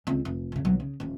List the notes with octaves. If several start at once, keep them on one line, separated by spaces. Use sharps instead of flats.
C#2 C4
F1
F2 C#3
B1 F#3
C#3
D#1 A#1